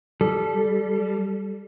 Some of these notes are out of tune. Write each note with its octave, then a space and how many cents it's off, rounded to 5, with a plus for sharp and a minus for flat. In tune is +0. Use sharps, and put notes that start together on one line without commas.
G3 +0 A4 -15